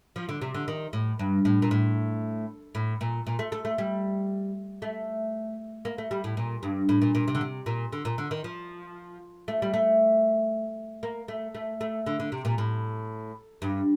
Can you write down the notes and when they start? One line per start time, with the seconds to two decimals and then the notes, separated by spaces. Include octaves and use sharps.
0.16 F3
0.29 D3
0.42 C3
0.54 D3
0.68 D#3
0.93 A2
1.19 G2
1.45 A2
1.62 A#2
1.71 A2
2.75 A2
3.01 A#2
3.27 A#2
3.39 A3
3.52 A3
3.65 A3
3.78 G3
4.82 A3
5.85 A#3
5.98 A3
6.11 G3
6.24 A2
6.37 A#2
6.63 G2
6.89 A2
7.02 A#2
7.15 A#2
7.28 C3
7.35 D3
7.41 C3
7.66 A#2
7.92 D3
8.05 A#2
8.18 D3
8.31 D#3
8.44 F3
9.48 A3
9.62 G3
9.74 A3
11.03 A#3
11.28 A3
11.55 A3
11.81 A3
12.06 D3
12.20 D3
12.32 C3
12.45 A#2
12.58 A2
13.62 G2